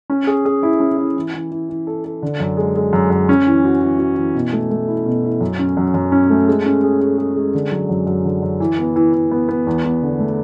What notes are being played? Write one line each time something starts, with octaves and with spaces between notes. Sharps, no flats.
C#4
G#4
G#4
E4
C#4
E4
E3
E3
E3
E3
A4
A4
D3
F#2
G#3
G#3
F#2
F#2
C#4
E3
F#4
E3
F#4
E3
B2
A3
A3
E4
B2
E4
F#2
C#4
F#2
F#2
C#4
A3
G#3
C#4
G#4
G#4
G#4
G#3
D3
F#3
F#2
F#2
D3
F#2
E3
B3
E3
E3
B3
B3
E2
E2
D3
A3